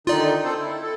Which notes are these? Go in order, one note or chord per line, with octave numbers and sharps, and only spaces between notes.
D3 D#3 D#4 F4 D5
C4 A4 C5
E4
A4